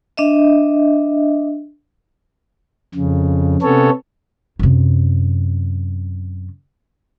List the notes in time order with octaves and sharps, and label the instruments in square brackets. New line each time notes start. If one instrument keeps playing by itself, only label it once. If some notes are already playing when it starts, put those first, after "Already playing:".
[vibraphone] D4 D#5 E5
[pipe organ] F2 C#3
C3 B3 C#4 A4 C#5
[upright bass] F#2 C3